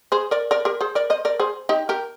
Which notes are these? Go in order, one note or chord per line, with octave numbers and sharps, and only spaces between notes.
G#4 C5
A#4 D5
A#4 D5
G4 A#4
G#4 C5
A#4 D5
C5 D#5
A#4 D5
G#4 C5
D#4 G4
G4 A#4